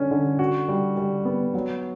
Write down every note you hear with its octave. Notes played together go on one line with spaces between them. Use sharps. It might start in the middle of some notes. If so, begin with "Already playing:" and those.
Already playing: D3 C#4
D3
F#4
G3
G3
B3
F#3